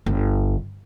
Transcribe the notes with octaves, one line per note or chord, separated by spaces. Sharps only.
G1